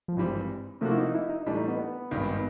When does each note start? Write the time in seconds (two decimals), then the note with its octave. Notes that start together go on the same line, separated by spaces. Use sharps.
0.08 F3
0.16 G#1 G2 E3 G3 C4
0.81 C3 F3 A3 A#3 D4 F#4
0.91 E4
0.98 D#4
1.14 E4
1.29 D#4
1.46 A2 E3 G3 D4
1.57 D#4
1.68 B3
1.78 B3
2.11 G#1 G2 D#3